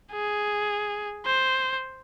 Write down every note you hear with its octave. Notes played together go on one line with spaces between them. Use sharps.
G#4
C5